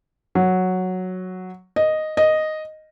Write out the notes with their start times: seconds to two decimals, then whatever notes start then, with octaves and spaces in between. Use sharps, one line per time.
0.35 F#3
1.76 D#5
2.17 D#5